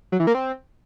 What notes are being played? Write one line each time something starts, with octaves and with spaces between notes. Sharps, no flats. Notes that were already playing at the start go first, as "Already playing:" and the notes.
F#3
E3
A#3
C4